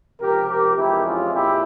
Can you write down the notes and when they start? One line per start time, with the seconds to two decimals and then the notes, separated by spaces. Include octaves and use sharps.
0.20 C#2 C3 F3 G4 A#4
0.48 G4 A#4
0.77 F2 E3 G#3 C4 E4 G4
1.06 C#4 F4
1.34 A#2 E4 G4